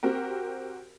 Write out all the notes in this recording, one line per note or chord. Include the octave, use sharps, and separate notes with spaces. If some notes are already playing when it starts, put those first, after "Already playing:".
C4 F#4 G4 A#4